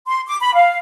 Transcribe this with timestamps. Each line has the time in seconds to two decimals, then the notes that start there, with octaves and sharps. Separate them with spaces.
0.06 C6
0.27 D6
0.41 B5
0.54 F5